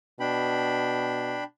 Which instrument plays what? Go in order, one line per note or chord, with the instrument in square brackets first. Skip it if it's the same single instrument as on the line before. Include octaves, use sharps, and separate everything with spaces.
[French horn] B2 [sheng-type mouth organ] D4 G5 B5